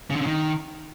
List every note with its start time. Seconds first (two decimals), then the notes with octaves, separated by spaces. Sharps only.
0.11 C#3
0.16 D3
0.21 C#3
0.27 D#3